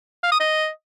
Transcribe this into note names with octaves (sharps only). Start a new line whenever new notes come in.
F5
D#6
D#5